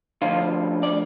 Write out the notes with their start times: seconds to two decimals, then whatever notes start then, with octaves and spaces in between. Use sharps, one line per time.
0.22 D2 D3 F3 F4
0.83 D5